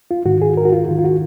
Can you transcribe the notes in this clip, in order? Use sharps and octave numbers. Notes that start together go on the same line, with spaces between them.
F4
G#2 D#3 F#4
G#4
A#4
F#4
F4
G#2 D#3 F4
F4
F#4